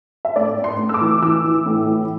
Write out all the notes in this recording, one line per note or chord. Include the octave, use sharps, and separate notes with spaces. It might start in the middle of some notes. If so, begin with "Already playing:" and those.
E5
A2 D5
A2
C6
A2
E6
D6
E3
E3 E6
E3
A2
E3